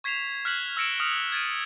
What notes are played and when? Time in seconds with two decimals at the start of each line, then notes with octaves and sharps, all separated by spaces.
0.04 C#6 G#6 B6 C7 E7 F7
0.45 F6 F#6 G#6 B6 C7 F#7
0.77 E6 F6 A#6 C#7 D7 E7
1.00 D#6 F6 F7
1.32 G#6 A6 D7 D#7